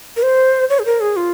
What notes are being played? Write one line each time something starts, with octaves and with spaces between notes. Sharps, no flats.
A#4
C5
C#5
G#4
A#4
G#4
F4